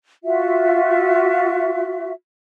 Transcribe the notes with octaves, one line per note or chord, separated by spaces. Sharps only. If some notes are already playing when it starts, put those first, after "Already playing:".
F4 F#4 E5